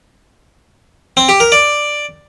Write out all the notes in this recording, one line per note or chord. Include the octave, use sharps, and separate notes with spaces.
C4
G4
A#4
D5